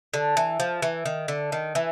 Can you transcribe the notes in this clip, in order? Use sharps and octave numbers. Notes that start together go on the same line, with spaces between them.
D3
E3
F3
E3
D#3
D3
D#3
E3